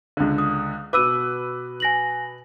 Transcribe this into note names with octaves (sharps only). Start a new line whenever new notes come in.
C#2 D3
D#6
B2 B4 D6 E6 D#7
G#5 A#6 F#7